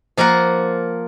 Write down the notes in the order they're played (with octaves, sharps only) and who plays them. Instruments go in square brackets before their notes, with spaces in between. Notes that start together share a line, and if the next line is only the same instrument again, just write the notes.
[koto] F3 A#3 F4 A#4 F#5